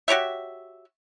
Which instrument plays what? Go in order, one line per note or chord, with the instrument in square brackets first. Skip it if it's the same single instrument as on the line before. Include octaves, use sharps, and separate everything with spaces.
[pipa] F#4 G4 C#5 E5